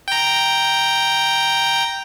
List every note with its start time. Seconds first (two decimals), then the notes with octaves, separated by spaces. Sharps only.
0.08 G5 A#5